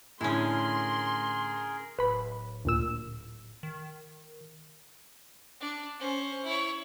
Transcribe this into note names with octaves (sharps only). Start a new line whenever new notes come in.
A2 D3 C#4 E4 G#4 A#4 C6
D1 B4 B5
D2 A#2 E6
D#3
D4
C#4 C5
E4 C#5